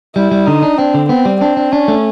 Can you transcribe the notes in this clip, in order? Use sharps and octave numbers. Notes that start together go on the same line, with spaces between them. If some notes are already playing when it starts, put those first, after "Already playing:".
G3 E4
G3
D3 D#4
D4
C4 D4
D3
B3 C4
G3
C4 D4
D4
C#4 D4
A3